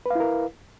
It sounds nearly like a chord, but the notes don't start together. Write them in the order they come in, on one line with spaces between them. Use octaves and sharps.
B4 F5 E4 A#4